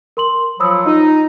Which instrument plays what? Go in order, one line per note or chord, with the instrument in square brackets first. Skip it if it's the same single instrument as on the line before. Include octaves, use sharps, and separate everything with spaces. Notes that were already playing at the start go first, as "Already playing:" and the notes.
[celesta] A#4 C6 F#7
[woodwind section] F3 F#3 [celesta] B5 D#6 E6
[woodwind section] D#4 [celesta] F4